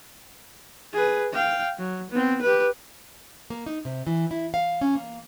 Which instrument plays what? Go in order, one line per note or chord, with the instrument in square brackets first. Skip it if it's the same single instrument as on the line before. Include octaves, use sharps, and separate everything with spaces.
[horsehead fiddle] G#4 B4
F5 G5
F#3
B3 C4
G4 B4
[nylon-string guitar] A#3
D#4
C3
E3
E4
F5
C#4
A#3